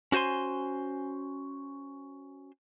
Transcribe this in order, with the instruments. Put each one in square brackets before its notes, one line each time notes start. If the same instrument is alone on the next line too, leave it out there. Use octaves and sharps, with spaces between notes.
[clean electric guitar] C#4 F#4 C5 G#5 C6